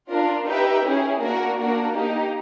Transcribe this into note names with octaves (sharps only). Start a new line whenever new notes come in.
D4 F4 A#4
D#4 G4 B4 E5 G5
C#4 E4 G#4
A#3 D4 F#4 A#4
A#3 D4 F#4 A#4
A#3 D#4 G4